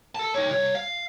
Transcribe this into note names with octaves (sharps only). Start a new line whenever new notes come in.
A4 A5
D#4 C#5
C2 C#5
F5